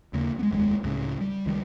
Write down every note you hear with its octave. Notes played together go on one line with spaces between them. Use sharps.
D#2 C#3 A#3
G#3 B3
F1 D#2 B2 G#3
C#2 A2 C#3
G3
C#2 D#3 G3